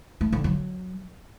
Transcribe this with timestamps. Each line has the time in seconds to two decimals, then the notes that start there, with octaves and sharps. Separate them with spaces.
0.21 A3
0.32 D3
0.44 F#3